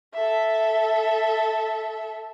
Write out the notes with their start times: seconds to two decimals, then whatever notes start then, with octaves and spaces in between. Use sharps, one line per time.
0.14 A4 E5